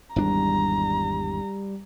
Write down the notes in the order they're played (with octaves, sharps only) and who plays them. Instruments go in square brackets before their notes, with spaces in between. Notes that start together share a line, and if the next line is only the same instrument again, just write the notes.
[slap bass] G#1 E2 D4 [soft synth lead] G3 [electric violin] A#5